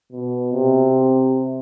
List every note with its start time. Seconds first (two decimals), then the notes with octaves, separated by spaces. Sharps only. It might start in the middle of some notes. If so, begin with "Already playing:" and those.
0.12 B2
0.53 C3